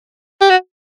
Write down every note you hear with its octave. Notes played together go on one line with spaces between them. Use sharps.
G4
F#4